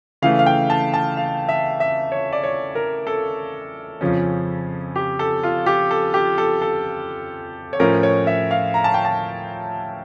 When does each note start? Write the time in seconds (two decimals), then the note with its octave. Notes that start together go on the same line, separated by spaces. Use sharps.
0.22 C#3 E3 A3 F5
0.39 F5
0.46 G5
0.70 A5
0.94 A5
1.17 F5
1.49 E5
1.80 E5
2.12 C#5
2.33 D5
2.43 C#5
2.75 A#4
3.07 A4
4.01 F2 C#3 F3 C#4
4.96 G4
5.19 A4
5.43 F4
5.66 G4
5.91 A4
6.14 G4
6.38 A4
6.62 A4
7.73 C#5
7.80 A2 F3 C#4 A#4
8.03 C#5
8.27 E5
8.51 F5
8.74 A#5
8.84 A5
8.94 G5
9.05 A5